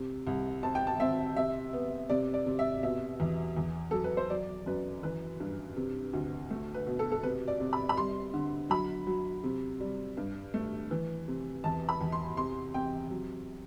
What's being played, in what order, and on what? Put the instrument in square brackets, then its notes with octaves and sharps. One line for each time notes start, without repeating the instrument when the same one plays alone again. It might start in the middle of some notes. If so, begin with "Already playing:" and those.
Already playing: [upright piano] C3
C2
C4 A5
G5
A5
C4 E5
C3 E5
B3
C3 D5
D5
C3
E5
B2 E5
E2
E2
F#3 A4
B4
C5
F#3 D5
F#2 B4
E3 B4
G2
C3
D2
A3
B4
B2
A4
A4
C3 B4
D5
C3
B5
B5
G3 C6
D3
F#3 B5
F#3
C3
G3
G2
A3
E3
C3
E2 A5
B5
E2
C6
C3 C6
C3 G5
F#3